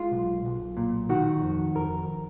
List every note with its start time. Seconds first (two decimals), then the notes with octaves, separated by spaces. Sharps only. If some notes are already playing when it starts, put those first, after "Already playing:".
Already playing: G#3 F4
0.11 B1
0.45 B1
0.77 A#2
1.09 D#3 F#4
1.42 F2
1.75 F2 A#4